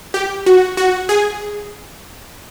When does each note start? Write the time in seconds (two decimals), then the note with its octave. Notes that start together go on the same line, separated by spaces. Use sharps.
0.14 G4
0.46 F#4
0.77 F#4
1.09 G#4